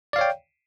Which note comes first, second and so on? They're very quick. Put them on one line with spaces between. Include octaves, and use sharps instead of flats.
D5 F5 C#5 G5